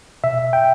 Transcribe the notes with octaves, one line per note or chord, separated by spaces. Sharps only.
B2 E5
G5